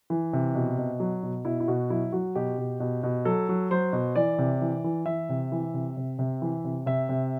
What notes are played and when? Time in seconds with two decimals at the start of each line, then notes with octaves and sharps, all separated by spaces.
0.10 E3
0.33 C3
0.55 B2
0.78 B2
1.00 F#3
1.23 B2
1.45 B2 E4
1.60 E4
1.68 B2 F#4
1.90 F#3 E4
2.12 F#3 F#4
2.35 B2 G4
2.58 B2
2.80 B2
3.03 B2
3.25 F#3 A4
3.49 F#3
3.71 F#3 C5
3.93 B2
4.16 E3 D5
4.38 C3
4.61 E3
4.84 E3
5.06 E3 E5
5.29 C3
5.52 E3
5.74 C3
5.97 C3
6.19 C3
6.42 E3
6.64 C3
6.86 C3 E5
7.09 C3